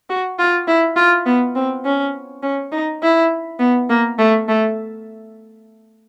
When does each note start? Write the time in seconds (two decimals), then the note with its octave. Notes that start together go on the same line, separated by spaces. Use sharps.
0.10 F#4
0.39 F4
0.68 E4
0.96 F4
1.26 B3
1.56 C4
1.85 C#4
2.43 C#4
2.72 D#4
3.02 E4
3.60 B3
3.90 A#3
4.19 A3
4.48 A3